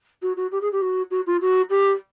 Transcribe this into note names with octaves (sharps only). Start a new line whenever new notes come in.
F#4
F#4
G4
G#4
G4
F#4
F#4
F4
F#4
G4